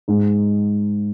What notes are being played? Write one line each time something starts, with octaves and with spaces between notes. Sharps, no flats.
G#2